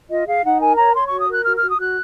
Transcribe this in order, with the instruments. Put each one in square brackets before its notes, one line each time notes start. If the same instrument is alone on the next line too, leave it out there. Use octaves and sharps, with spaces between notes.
[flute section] F4 D#5
G#4 F5
D#4 F#5
A#4 G#5
C#5 A#5
C#5 C6
F#4 C#6
D#6
A#4 F#6
F#4 F6
F#4 F6
D#6
F#4 F#6